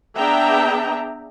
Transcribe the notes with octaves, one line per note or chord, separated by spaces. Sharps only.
B3 D4 G#4 E5 G5 A#5